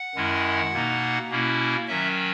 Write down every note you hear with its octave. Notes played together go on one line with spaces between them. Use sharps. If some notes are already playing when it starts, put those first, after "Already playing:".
Already playing: F#5
F#2 D#3 G#3 C#4 E4
B2 A#3 D#4
B2 A#3 C#4 E4
D#3 F#3 C#4 E5